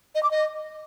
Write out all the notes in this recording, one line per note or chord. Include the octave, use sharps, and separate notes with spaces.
D#5
D6
D#5